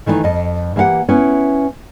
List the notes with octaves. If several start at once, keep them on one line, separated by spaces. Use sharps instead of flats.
D#3 E3 A3 B3 D#4
F2 D#5
E3 A#3 G4 F5 F#5
B3 C#4 E4